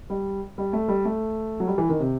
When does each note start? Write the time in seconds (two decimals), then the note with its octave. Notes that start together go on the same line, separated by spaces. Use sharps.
0.10 G3
0.58 G3
0.73 A3
0.88 G3
1.05 A3
1.60 F#3
1.67 G3
1.78 E3
1.89 D#3
2.00 C3